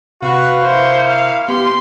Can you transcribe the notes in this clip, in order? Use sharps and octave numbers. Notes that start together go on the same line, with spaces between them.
C3 F#4 B4 F5
A#3 E4 C5 C#6
F5
B3 G4 C6